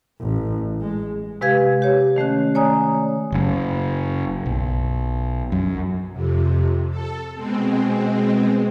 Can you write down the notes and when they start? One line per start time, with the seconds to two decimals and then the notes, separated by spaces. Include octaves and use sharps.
0.20 A1
0.81 G#3
1.41 C3 G#3 G4 B4 F5 G#6
1.82 G4 C#5
2.16 D#3 A3 C#4 F#6
2.55 C#5 D5 G#5 A#5 D#6
3.32 F#1
4.46 B1
5.52 F#2
6.13 F2 C3
6.89 A4
7.35 B2 G#3 C4